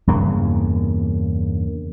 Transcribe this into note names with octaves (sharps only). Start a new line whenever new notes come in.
E2 G2 C#3 A#3